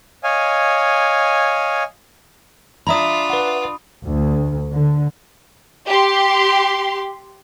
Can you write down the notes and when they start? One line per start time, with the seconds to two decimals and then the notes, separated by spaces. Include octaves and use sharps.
0.24 C#5 D#5 F5 G#5
2.87 D4 F4 E5 A#5 B5 D#6
3.30 B4 F#5
4.05 D2
4.72 D3
5.88 G4 C6